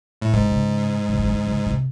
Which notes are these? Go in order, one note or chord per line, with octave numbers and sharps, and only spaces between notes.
A2
G#2 C#3
C3
C#3
C#3
C#3
D3
C#3
C3